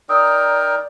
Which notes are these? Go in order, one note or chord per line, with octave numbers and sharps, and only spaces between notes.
D#4 A#4 D5 G5 D#6 E6